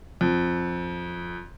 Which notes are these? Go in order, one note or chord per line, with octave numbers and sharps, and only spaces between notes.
F2